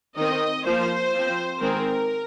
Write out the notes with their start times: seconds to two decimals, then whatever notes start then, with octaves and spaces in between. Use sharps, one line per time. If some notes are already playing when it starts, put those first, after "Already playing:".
0.17 D#3 C4 D#5
0.65 F3 A#3 C5
1.13 F3 C4
1.60 D#3 G#3 C4 A#4